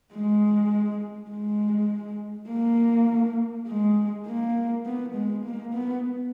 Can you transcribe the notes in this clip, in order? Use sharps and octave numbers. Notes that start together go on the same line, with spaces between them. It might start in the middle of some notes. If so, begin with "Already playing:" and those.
G#3
G#3
A#3
G#3
A#3
B3
G#3
A#3
B3